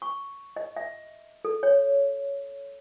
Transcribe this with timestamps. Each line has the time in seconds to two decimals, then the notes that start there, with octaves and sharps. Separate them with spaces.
0.02 C#6
0.56 D#5
0.77 E5
1.45 A4
1.63 C#5